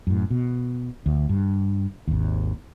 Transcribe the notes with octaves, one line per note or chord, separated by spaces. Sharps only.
F#2 A2
B2
D2
G2
G#1 D#2